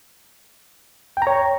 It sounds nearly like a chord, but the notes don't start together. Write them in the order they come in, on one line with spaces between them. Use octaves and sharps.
G5 A#5 C#5